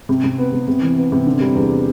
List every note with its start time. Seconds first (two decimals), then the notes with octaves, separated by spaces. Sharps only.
0.09 C3
0.24 C3
0.38 B3
0.53 C3
0.68 C3
0.82 E3
0.96 B3
1.12 C3
1.26 D3
1.40 G3
1.55 E2